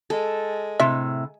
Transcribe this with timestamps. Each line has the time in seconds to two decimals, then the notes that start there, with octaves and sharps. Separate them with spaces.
0.10 G#3 A4
0.80 A2 C3 E5